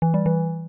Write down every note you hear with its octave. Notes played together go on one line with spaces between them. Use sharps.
E3
G3
E3